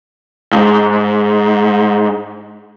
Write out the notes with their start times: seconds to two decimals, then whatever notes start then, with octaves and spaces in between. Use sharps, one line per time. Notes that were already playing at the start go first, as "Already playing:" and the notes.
0.52 C#2 G#2